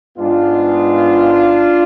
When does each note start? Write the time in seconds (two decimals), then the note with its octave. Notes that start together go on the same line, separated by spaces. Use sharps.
0.17 G#2 G#3 B3 D4 F4